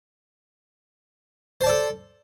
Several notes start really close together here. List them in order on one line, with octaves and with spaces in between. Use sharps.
C5 A5 D5 A4